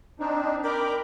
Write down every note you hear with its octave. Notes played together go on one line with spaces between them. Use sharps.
C4 D4 D#4
A#4 G5 B5 D6